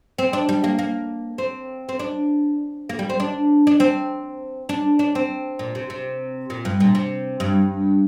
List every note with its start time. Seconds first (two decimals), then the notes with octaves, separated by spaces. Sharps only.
0.18 C4
0.33 D4
0.49 G3
0.64 A#3
0.79 A#3
1.38 C4
1.89 C4
1.99 D4
2.89 A#3
2.99 G3
3.10 C4
3.20 D4
3.67 D4
3.80 C4
4.69 D4
4.99 D4
5.15 C4
5.59 A#2
5.75 C3
5.90 C3
6.50 A#2
6.65 G2
6.80 A#2
6.95 C3
7.40 G2